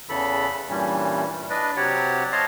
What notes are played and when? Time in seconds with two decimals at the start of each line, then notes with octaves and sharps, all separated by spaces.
0.09 E2 C#3 E3 A4 B5
0.69 G2 A#2 E3 G3 C#4
1.50 D4 B4 D5 D#5
1.77 C3 F#3 G4 C#5 D5 F#5
2.32 C#5 D#5 F5 A5 A#5 C6